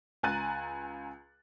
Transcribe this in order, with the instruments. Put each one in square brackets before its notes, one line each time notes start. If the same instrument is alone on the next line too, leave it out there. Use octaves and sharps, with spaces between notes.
[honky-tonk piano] C#2 G#5 A#5 F#6 A6 D#7